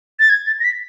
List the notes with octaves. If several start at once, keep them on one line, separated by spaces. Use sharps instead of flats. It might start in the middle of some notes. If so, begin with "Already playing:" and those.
A6
G#6
A6
A#6
B6